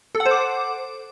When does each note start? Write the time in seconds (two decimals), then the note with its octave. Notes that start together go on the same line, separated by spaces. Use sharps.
0.15 A4
0.20 F#5
0.26 C5
0.31 D6